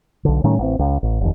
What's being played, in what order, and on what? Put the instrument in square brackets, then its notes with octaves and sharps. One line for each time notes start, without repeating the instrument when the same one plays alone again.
[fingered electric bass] B1 D3
A2 D#3 G3 C#4
A1 C4
C#2
A1
F1 D#2